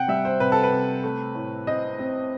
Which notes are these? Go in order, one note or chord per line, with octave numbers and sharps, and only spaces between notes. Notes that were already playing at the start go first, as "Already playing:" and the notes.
Already playing: C3 F#5 G5
G3 E5
C5
C3 B4
A4
B4
C3
A3
A2
C4 D#5
C4